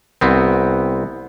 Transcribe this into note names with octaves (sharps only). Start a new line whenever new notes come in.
C2 B3 C4